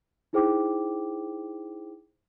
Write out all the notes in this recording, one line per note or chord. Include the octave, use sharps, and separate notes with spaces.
D#4 E4 G#4 C5 G5 D6